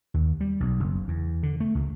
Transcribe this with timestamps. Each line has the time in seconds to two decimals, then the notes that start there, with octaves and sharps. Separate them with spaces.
0.14 D#2
0.41 G3
0.60 B1
0.80 F#1
1.08 E2
1.43 D3
1.60 A3
1.75 C#2